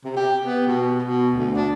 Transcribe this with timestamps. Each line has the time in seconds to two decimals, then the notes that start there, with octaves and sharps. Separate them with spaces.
0.04 C3
0.16 G4
0.45 B3
0.67 B2
1.03 B2
1.35 D2
1.56 D4